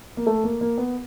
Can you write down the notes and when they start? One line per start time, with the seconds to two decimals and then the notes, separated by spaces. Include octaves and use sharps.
0.17 A#3
0.27 A3
0.44 A#3
0.61 A#3
0.78 B3